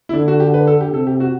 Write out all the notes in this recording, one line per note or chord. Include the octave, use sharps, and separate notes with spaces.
E4
D3 D4
F#4
G4
B4
A4
G4
C3 A4
G4
F#4